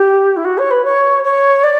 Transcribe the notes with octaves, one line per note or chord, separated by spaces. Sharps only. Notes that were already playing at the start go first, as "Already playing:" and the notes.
Already playing: G4
E4
F#4
C#5
B4
C#5
C#5
D5